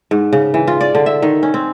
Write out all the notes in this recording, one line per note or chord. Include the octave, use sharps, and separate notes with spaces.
G#2
C#3
E3
F4
D5
D3
E5
D#3
C#4
C4